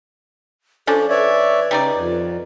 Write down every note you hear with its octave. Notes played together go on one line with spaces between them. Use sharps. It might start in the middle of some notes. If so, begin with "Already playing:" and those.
F3 C#4 D4 A4
B4 C#5 D5 E5
C#3 G3 D#4 D5
F2